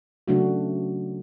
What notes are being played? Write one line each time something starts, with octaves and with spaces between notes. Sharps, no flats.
C#3 F#3 A3 D4 F#4